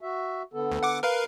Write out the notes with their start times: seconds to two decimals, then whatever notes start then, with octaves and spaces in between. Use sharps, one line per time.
0.01 F#4 E5
0.53 D3 B3 A4
0.72 D2
0.83 F#5 D6
1.03 A#4 B4 F5